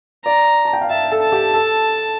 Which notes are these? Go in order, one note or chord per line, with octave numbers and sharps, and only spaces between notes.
D5 A#5
A5
G5
F5
E5 A5
A4
A5
G4
A4